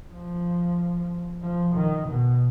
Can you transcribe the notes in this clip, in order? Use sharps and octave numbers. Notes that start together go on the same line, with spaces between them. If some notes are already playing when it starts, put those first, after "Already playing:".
F3
F3
D#3
B2